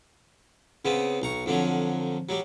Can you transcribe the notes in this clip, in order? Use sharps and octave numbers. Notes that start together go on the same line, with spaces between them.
C#3 B3 C4
B1 A#5 C#6
F2 D3 F3 F#3
F#3 G3